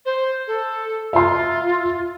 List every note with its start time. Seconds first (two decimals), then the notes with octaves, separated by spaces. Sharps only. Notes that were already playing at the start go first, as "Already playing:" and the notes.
0.06 C5
0.47 A4
1.13 F4 E5 C6